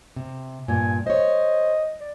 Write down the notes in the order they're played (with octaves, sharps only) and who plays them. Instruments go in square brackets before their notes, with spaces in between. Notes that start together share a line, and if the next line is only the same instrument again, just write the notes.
[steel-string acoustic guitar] C3
[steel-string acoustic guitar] G2 A#2 [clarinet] G#5
[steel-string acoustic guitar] C5 C#5 [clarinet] D#5
[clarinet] D5